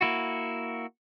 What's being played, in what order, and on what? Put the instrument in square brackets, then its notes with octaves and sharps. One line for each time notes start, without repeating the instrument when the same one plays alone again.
[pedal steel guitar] A#3 E4 F#4